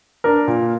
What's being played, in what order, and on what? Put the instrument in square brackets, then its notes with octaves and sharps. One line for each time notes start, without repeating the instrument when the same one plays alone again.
[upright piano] D4 A#4
A#2